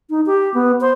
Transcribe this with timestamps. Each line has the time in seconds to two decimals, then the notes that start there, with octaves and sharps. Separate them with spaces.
0.10 D#4
0.26 G4
0.54 B3
0.81 C5